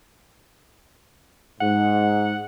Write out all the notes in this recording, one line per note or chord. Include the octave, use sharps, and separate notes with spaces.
G#2 F#5